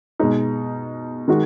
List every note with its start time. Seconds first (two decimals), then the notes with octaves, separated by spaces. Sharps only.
0.20 B2 G#3 D#4
1.28 D#3 G#3 D#4 F#4